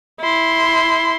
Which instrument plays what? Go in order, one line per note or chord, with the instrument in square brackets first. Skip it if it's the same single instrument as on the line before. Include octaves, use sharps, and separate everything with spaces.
[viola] E4 C6